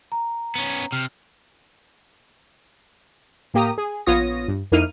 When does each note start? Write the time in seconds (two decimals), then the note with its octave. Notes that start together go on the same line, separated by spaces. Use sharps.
0.12 A#5
0.55 B3 C#4
0.92 C3 F6
3.54 A2 A#3 G4 A#5 D#6
3.78 G#4
4.06 A#1 B3 F4 C#5 D#6 A#6
4.48 G2
4.72 F2 A#3 D#4 E4 F6 D#7